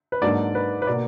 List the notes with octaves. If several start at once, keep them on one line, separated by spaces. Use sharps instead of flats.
B4
G#2 F#3 A#3 D4 D5
B4
B4
B2 A#3 D5